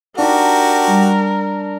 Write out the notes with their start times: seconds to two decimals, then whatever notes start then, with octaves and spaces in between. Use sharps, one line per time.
0.18 D4 D#4 F#4 G4 A#4 A5 D6
0.88 G3